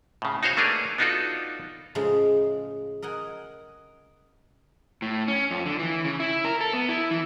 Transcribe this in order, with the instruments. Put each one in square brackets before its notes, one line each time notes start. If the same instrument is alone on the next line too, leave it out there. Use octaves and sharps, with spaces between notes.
[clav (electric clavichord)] A2 C#3
D#4 F#4 C5 C#5 F5
A3 A#3 D4 G#4 A#4 B4
B3 D4 D#4 F4 F#4 A4
[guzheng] A2 C#3 F3 G#3 D#4
A#4 D#5 F#5 G#5
[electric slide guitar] A2
C#4
F2
D3
E3
C#3
E4
A#4
A4
B3
E4
E3